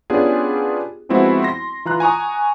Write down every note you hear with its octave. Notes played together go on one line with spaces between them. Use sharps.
B3 C#4 D4 F4 G4 G#4
F3 G#3 B3 C4 E4 F#4
C6 A#6
E3 F4 A#5 C6 F#6
G#5 A#5 C#6 D#6